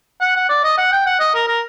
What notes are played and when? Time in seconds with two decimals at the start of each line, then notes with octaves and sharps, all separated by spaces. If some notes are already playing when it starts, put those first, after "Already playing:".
0.21 F#5
0.36 F#5
0.49 D5
0.64 D#5
0.78 F#5
0.92 G5
1.06 F#5
1.20 D#5
1.34 A#4
1.47 A#4